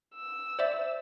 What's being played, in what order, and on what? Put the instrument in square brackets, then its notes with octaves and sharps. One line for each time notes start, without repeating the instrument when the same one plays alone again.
[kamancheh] E6
[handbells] C5 D5 E5